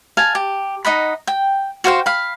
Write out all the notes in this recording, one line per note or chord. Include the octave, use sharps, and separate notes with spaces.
F5 G#5 A5
G4
D#4 D#5 F#5 B5
G5
F#4 C5 F5 G5
F5 B5